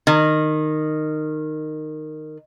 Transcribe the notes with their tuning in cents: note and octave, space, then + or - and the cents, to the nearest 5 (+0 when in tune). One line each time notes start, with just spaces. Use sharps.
D#3 -15